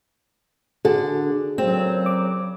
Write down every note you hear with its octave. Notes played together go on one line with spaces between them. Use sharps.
D3 F#4 G#4 A4
A#2 C#3 F#3 C4
D6